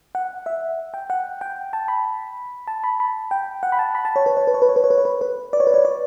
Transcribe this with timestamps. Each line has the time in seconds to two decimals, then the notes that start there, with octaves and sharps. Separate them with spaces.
0.15 F#5
0.46 E5
0.94 G5
1.10 F#5
1.41 G5
1.73 A5
1.88 B5
2.67 A5
2.84 B5
3.00 B5
3.31 G5
3.63 F#5
3.72 B5
3.79 A5
3.95 B5
4.05 A5
4.16 C#5
4.26 B4
4.37 C#5
4.47 B4
4.54 C#5
4.62 B4
4.69 C#5
4.76 B4
4.84 C#5
4.90 B4
4.98 C#5
5.05 B4
5.21 B4
5.53 D5
5.60 C#5
5.67 B4
5.74 C#5
5.85 D5